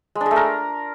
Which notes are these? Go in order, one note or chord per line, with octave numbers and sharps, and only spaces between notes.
G#3
D4
G#3
A3
A#4